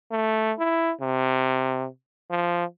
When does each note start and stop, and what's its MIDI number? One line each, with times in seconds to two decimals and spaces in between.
0.11 0.52 57
0.59 0.92 64
1.01 1.87 48
2.31 2.65 53